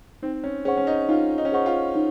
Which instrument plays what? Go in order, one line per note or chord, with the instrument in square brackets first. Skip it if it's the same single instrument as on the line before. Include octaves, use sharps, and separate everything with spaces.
[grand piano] C4 [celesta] D#4
[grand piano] C#4
[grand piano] C#4 [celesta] G#4 C5 F#5 C#6
[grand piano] C#4
D#4
[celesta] D#4 [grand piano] F4
[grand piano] D#4
C#4
[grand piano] D#4 [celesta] G#4 C5 F#5 C#6
[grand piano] F4
[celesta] D#4